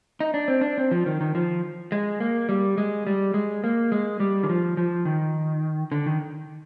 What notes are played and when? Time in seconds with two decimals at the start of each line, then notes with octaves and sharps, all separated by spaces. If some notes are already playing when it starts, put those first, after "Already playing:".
0.20 D#4
0.34 D4
0.48 C4
0.61 D4
0.78 C4
0.91 F3
1.06 D#3
1.21 D#3
1.35 F3
1.92 G#3
2.20 A#3
2.49 G3
2.78 G#3
3.07 G3
3.34 G#3
3.64 A#3
3.92 G#3
4.20 G3
4.43 D#3
4.49 F3
4.77 F3
5.05 D#3
5.92 D3
6.06 D#3